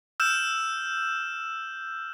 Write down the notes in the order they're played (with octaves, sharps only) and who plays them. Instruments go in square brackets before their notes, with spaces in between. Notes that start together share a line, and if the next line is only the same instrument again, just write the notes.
[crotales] E6 F6 G6 E7